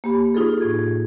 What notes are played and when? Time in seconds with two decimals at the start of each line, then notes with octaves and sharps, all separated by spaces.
0.04 A#3 G4 B5
0.35 D#4 F4 G#4 A4
0.61 A2 G#6